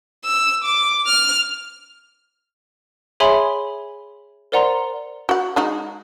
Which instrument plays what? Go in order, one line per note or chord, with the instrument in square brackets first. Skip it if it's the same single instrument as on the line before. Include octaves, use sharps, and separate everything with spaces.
[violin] E6
D6
F6
[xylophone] G#4 C#5 E5 G#5 B5 C6
A#4 C5 D5 F#5 A#5 C6
[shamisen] F#4 F#5
G#3 D#4 F#4